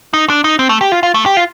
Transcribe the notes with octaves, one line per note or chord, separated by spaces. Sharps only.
D#4
D4
D#4
C4
A3
G4
F4
F4
A3
G4
F4